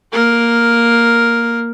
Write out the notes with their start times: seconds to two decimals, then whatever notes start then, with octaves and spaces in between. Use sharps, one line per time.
0.13 A#3 A#4